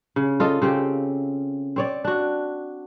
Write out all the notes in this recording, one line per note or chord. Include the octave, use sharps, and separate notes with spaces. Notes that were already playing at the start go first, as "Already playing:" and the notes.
C#3
F4 A4 D#5
C#3 C4 G4
C4 C#5 D5
D4 F#4